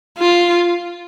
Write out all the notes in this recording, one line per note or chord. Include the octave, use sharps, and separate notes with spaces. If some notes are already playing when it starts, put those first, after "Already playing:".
F4